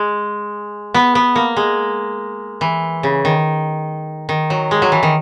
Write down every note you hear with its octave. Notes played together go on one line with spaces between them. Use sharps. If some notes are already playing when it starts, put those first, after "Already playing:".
Already playing: G#3
B3
B3
A#3
G#3
E3
C#3
D#3
D#3
F#3
G#3
F#3
E3
D#3